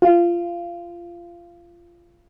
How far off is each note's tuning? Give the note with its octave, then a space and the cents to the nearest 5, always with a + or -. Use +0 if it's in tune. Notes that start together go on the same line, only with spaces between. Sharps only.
F4 -20